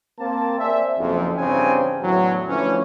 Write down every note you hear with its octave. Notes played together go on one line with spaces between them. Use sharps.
A#3 C4 A5
G#4 C5 D5 E5
F#1 F2
G2 C#3 E3 C4 D4 G#5
E2 A2 D3 F#3
D3 E3 F3 A3 C#4